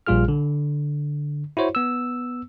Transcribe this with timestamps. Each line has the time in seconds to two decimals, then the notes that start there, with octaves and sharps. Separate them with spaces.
0.07 A#1 A#2 G3 F4 G#4 F6
0.28 D3
1.57 E4 F#4 C5 C#5
1.75 B3 E6